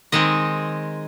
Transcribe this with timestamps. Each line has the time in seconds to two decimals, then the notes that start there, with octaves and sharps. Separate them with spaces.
0.12 D#3 G#3 C4 D#5